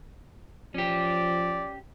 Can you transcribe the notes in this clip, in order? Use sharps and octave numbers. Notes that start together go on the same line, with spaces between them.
F3 C#4 G4 D5